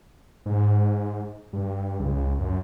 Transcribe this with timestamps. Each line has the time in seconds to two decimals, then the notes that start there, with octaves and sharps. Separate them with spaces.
0.46 G#2
1.53 G2
2.00 C#2
2.39 F#2